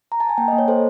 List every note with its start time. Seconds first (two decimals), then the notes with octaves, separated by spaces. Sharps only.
0.12 A#5
0.20 A5
0.29 G#5
0.38 A#3 G5
0.48 D#5
0.53 A#3
0.58 C#5
0.68 A4 C5